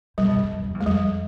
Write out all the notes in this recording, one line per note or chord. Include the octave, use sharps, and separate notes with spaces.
B2 G3
G2
F2
F#2
F2
F2
E2
G#3
F2 G3